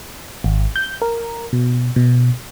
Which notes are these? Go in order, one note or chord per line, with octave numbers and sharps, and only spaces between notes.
G#1
G6
A#4
B2
B2